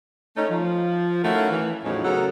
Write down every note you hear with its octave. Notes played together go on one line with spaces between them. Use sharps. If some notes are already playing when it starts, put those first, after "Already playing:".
A3 C#4 D#4
F3
D#3 A3 C#4 E4 F#4 F5
E3
E2 A2 F3 F#3 C#4 D#4
C#3 F#3 B3 A4 A#4 F#5